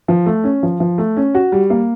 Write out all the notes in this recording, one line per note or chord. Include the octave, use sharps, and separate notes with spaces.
F3
A3
C#4
F3
F3
A3
C#4
F#4
G3
A#3